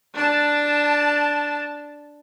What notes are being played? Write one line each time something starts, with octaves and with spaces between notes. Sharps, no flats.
D4 A5